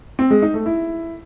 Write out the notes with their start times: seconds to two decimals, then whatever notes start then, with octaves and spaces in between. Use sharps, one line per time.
0.19 C4
0.31 G#3
0.42 D#4
0.54 A3
0.66 E4